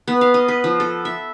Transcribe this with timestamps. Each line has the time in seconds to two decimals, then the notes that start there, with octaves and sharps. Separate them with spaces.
0.08 B3
0.21 F5
0.34 D#5
0.48 B4
0.64 F3
0.80 A4
1.05 E5